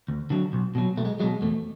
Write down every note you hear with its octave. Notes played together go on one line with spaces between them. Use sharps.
D2
D3 F#3
B1
B2 F#3
B1 A3
G#3
B2 F#3 G#3
E2 A3